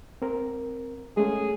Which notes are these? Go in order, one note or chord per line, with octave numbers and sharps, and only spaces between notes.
C4 A#4
G#3 A3 C#4 G#4